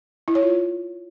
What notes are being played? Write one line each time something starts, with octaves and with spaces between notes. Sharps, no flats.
E4
C#5
F4